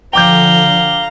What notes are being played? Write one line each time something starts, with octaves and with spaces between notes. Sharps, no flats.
D3 F3 F5 G5 A#5 D6 G6 G7